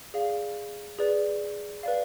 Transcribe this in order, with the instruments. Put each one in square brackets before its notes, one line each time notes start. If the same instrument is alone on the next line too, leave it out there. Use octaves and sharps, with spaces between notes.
[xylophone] G#4 D5 F5
G#4 B4 D5
B4 D5 F5